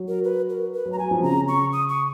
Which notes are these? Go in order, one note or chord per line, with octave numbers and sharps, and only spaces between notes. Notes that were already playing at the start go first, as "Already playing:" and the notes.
Already playing: F#3
A#4
B4
A#4
B4
F#3
A#5
F#3 G#5
F3
C#3 A#5
C#6
D#6
C#6